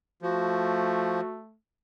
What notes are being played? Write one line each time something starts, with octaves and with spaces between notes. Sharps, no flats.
F3 A3 F#4